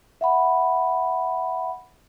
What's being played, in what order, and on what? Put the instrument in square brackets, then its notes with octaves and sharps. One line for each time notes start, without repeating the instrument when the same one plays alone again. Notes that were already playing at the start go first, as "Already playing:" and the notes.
[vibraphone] E5 F#5 B5